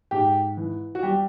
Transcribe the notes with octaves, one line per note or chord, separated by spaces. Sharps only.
G#2 G4
E3
F#4
G3 G4